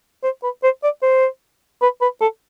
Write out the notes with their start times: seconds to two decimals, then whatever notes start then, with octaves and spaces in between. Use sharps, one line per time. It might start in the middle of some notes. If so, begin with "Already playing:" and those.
0.24 C5
0.43 B4
0.63 C5
0.83 D5
1.02 C5
1.82 B4
2.01 B4
2.21 A4